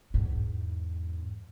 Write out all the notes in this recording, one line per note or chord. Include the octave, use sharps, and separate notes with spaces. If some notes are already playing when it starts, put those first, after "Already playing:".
E2 G#2